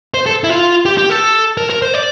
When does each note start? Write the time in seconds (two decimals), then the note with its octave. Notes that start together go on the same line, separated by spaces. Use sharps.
0.14 C5
0.26 A4
0.44 E4
0.50 F4
0.85 G4
0.98 G4
1.10 A4
1.57 A#4
1.70 A#4
1.82 C5
1.94 D5